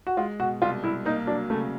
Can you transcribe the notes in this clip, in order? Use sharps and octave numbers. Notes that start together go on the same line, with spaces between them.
F#4
G#3 F4
B2 F#4
C2 F4
C2 E4
A#3 D#4
F#3 D4
C#3 A3